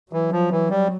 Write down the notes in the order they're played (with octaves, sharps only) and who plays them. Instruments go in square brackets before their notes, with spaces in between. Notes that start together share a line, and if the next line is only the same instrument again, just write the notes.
[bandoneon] E3 [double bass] F#3
[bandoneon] F3
E3
G3